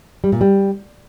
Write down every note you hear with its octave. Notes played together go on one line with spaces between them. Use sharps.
G3
A#2
G3